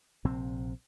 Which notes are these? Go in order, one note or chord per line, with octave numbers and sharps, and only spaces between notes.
A#1 C3 C4